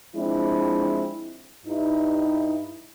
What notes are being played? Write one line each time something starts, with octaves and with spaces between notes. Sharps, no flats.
F3 G#3 C4 D4 E4
G2 D#4 E4